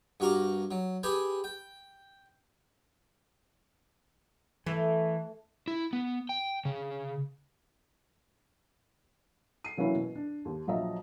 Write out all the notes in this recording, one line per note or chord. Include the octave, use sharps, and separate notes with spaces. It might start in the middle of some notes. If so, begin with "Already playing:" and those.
G2 F#4 A#4 D6
F#3
G4 G#4 B4 G5 G#5
G5
E3 A3
E4
B3
G5
C#3
C7 D#7
E3 F#3 A#3 C#4 E4
B2
D4
D#2
A#1 F3 F#3 D#5 E5 A#5